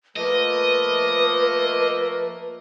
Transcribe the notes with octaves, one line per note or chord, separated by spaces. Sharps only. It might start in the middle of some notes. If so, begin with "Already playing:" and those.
F3 A3 A#3 B4 D#5